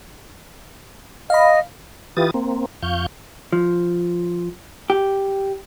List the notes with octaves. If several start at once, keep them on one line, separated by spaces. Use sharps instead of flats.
D#5 F5 B5
E3 F4 G4 B4 D#6 A6
A#3 C4
F2 F5 C#6 G6
F3
G4